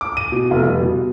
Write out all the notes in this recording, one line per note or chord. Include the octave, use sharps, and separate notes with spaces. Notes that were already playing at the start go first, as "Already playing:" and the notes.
D6
D#7
B2
F1
G3
B2